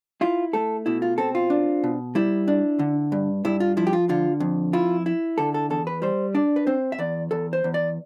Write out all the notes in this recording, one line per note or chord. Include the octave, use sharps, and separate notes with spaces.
E4 F4
A3 A4
B2 E4
F4
C4 A4
F4
D4
B2
G3 E4
D4
D3
G2
G2 E4
F4
F3 E4
G4
F4
D3 F4
F2
E4 F4
E4
D3 A4
A4
E2 A4
B4
G3 C5
D4 D5
B4
C4 C5
E5
E2 D5
E2 A4
C5
E2
D5